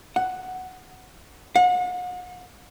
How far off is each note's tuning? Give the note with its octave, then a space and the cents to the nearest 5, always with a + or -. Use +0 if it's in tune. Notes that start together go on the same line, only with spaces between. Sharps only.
F#5 +5
F#5 -40